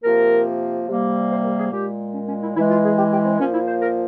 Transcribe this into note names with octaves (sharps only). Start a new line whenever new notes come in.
C3 F3 A#3 A#4
C3 G3 A#3
C5
A#4
G#4
A#2 G#3 G4
C#4
C#4
E4
E3 G#3 E4
F4
G#4
G4
G4
C4
A#2 F3 A#3 C#4
E4
C5
A#4